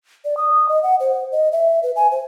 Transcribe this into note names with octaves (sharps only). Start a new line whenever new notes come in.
D5
D#6
D#5
F#5
C5
D#5
E5
B4
G#5
C5